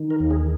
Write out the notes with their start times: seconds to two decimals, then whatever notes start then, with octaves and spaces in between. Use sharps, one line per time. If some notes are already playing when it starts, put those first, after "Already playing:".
Already playing: D#3
0.10 A#4
0.20 D#2
0.31 G#4